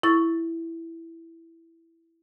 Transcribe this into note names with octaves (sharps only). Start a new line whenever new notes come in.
E4 C#6 A6